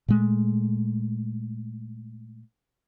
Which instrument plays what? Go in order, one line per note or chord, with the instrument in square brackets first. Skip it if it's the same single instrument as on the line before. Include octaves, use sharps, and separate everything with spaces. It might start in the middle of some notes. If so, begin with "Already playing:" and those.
[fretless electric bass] A#2 G#3 A3